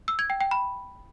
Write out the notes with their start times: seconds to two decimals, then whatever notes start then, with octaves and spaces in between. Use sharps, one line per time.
0.08 E6
0.19 G#6
0.30 G5
0.41 G5
0.51 B5